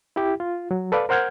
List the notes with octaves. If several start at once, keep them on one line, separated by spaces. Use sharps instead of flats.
E4 G4
F4
F#3
A4 B4 D5 F5
A#4 C5 F#5 F6 G6 G#6